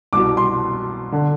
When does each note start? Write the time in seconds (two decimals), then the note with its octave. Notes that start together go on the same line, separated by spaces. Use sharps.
0.13 C2 B2 D6
0.37 C6
1.12 D3